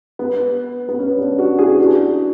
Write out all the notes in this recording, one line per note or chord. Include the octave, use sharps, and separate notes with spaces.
B3
B3
C#4
B3 D4
D4 F#4
E4 G#4
D4 F#4